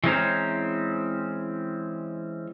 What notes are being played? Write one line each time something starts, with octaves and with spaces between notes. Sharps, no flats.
E3 G#3 C4 C#4 C5 A#5